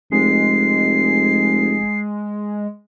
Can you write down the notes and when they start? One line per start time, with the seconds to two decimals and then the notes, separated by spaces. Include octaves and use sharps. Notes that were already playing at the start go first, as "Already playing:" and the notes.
0.12 F1 G#3 C7